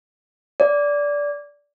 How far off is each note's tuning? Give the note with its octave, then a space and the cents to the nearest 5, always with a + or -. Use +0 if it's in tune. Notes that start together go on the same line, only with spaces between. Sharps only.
D5 -15